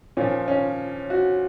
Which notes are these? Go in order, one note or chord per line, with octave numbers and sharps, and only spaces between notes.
A#2 F3 C#4
C#4
F#4